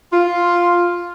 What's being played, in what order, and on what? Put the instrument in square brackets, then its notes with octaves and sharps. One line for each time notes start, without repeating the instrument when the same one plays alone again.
[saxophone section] F4